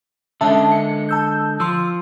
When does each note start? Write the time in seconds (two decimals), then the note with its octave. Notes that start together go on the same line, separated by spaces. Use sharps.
0.41 D3 G#3 C#4 E5 A5
0.72 C#7
1.09 A5 E6 G6
1.60 F3 C6 E6